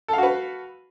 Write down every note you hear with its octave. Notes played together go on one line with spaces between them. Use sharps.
F#4 A4 B4 F5